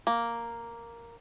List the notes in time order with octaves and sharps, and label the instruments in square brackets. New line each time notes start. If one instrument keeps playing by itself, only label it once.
[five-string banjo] A#3